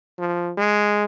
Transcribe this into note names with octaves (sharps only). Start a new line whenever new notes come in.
F3
G#3